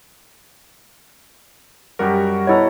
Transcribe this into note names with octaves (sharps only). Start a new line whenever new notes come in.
F#2 G3 F#4 G4 A#4
B2 E4 A4 C#5 A#5